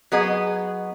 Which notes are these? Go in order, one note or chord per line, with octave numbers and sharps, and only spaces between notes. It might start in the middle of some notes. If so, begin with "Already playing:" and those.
F#3 B3 G#4 D#5